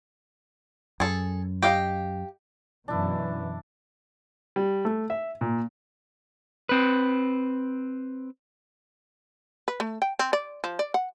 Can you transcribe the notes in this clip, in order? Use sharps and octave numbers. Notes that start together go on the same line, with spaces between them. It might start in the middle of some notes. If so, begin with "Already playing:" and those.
F#2 G#4 A4
G4 D#5 F5
F#2 B2 E3 D4 E4
G3
A3
E5
A#2
C4 B4
B4
A3
G5
C4
D5
F3
D5
F#5